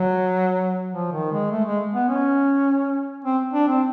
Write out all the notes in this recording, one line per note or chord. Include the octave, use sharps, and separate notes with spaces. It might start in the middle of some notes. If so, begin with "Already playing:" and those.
Already playing: F#3
F3
D#3
G#3
A3
G#3
B3
C#4
C4
D4
C4